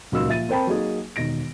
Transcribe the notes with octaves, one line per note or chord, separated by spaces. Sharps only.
D#1 C#2 F#3 A#3 D#4 E6
A#2 F3 E5 A6 D#7
C4 A#4 C5 G5 A5 B5
F#3 A#3 D#4 G#4
E1 D#3 A#6 D7